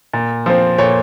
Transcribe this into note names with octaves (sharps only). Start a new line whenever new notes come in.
A#2
F3 C4
A#2 C#5